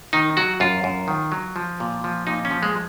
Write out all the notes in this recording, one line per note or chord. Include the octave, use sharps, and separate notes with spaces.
D#3 D#4
F#3 F#4
F#2 F4
F#2
D#3
F#3
F3
A#2
F3
A#2 D#4
C#4
F3
G#3